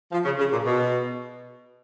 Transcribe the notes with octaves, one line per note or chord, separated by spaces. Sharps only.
F3
C#3
C#3
A#2
B2